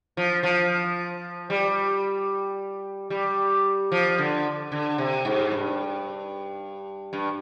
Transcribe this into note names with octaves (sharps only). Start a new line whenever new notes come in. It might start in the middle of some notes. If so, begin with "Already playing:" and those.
F3
F3
G3
G3
F3
D3
D3
C3
G#2
G2
G2